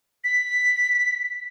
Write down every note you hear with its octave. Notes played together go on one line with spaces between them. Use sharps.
B6